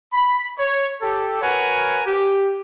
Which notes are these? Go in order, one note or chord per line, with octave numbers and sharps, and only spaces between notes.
B5
C#5
G4 A4
F#4 A#4 B4 C#5 F#5 G#5
G4